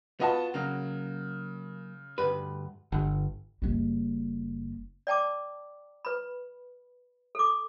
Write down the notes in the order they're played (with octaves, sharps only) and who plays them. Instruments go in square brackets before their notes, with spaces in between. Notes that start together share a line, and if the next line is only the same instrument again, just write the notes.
[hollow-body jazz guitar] B3 F4 F#4 [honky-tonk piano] B4 D#5 A5
[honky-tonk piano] C#3 [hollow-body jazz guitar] F#3 A#3
[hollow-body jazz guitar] D2 G2 B4
[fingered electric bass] G1
[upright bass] F#1 G3
[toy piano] D5 G5 A5 D6
B4 B5
A4 D6